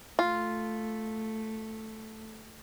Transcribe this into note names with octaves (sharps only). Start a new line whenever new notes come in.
A3 F4